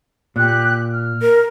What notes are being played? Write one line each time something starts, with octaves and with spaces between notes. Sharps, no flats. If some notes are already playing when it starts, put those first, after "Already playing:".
A#2 G4 F#6
F6
A#4